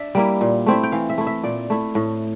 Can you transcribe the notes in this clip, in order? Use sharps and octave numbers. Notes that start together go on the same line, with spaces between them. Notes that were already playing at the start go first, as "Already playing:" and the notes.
Already playing: D4 D5 E5
G3 A#3 E4
A#2
A3 C4 E4
G5
E3 F5
E5
A3 E4
E5
A#2 D5
A3 E4
A2